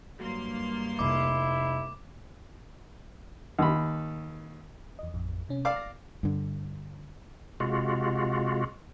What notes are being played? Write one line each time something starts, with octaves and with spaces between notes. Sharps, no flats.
G2 F#3 A#3 C6
F1 E4 D6
D#2 B5
E2 D#5
A1 F2
C3 C#4
D5 F5 D6 E6
A#6
G2 D3
C3 G#3 F4 F#4